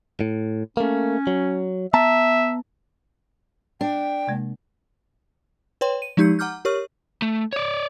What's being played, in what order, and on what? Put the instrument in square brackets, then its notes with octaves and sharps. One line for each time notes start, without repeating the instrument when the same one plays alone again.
[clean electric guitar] A2
[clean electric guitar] A3 A#3 [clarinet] C#4
[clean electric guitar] F#3
[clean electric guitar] B3 A5 A#5 [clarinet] E5
[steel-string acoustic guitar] D4 [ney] G5
[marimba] C3 G#3 A#3
[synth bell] B4 C#5 G5 C6
D#7
F3 G#3 D#4 G4 G6 C#7
F#5 A#5 D6 F6 G6
G4 A#4 C#5 C#6 F6
[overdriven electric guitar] A3
C#5 D5